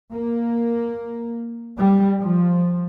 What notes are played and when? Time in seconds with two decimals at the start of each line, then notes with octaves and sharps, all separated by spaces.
0.11 A#3
1.79 G3
2.20 F3